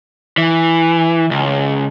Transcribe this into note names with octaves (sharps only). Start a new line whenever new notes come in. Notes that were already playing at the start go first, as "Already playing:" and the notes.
E3
C#2